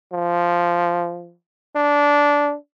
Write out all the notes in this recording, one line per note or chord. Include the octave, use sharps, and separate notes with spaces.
F3
D4